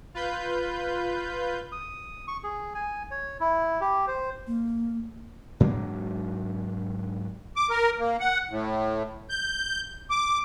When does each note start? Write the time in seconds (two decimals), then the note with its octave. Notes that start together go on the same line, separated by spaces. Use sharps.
0.14 F4 B4 G6
1.72 D#6
2.28 C#6
2.44 G#4
2.75 G#5
3.11 C#5
3.40 E4
3.81 G4
4.07 C5
4.47 A#3
5.60 G#2 F#3 A#3 D4
7.56 D6
7.70 A#4
8.00 A#3
8.20 F#5
8.50 A2
9.30 G6
10.10 D6